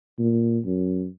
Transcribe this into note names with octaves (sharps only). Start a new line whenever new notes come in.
A#2
F#2